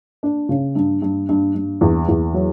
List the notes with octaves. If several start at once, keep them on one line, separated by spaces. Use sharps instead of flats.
D4
C#3
G2
G2
G2
G2
E2
E2
F#3